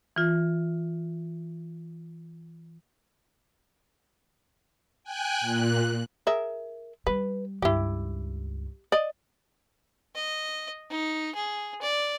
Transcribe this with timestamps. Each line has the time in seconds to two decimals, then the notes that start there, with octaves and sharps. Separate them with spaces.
0.16 E3 F4
5.03 G5 G#5 F#6
5.41 A#2 F#6
6.27 G#4 A#4 E5
7.07 G3 B4
7.62 C#2 G2 E4 G4
8.92 D5 D#5
10.15 D#5
10.91 D#4
11.35 G#4
11.82 D5